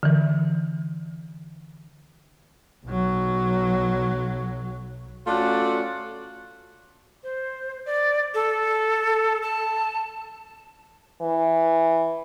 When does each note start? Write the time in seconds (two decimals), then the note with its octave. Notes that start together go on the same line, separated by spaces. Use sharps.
0.03 D3 E3
2.85 B1 F#3
5.27 A3 C#4 F4 F#4 A4 D5
7.23 C5
7.86 D5
8.34 A4
9.42 A5
11.22 E3